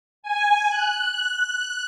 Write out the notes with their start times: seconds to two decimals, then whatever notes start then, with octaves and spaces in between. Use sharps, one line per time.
0.23 G#5
0.69 F#6